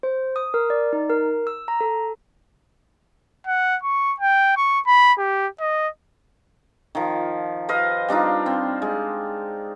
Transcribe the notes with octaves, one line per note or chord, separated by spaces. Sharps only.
C5
D#6
A#4
D5
D#4
A#4
E6
A#5
A4
F#5
C#6
G5
C#6
B5
G4
D#5
D#3 F3
B4 C5 D#5 F5
G3 D4 D#4 F4
C4
G#3